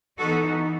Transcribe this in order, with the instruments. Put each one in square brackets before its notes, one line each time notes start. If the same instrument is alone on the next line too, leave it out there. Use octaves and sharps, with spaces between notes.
[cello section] E3 B3 D#4 F#4 A4